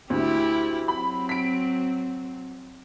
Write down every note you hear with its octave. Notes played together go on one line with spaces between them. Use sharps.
D2 E4 G4
F#3 C4 B5
B6 D7